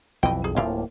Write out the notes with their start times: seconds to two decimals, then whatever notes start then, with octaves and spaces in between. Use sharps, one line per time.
0.23 B1 F2 E3 D#5 G5
0.44 G#4
0.56 D1 A2 F3 A#3 E4 F5